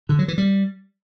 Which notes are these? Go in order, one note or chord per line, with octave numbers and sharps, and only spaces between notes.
D3
F#3
E3
G3